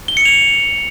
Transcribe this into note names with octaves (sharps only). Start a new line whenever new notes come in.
G7
C#7
F7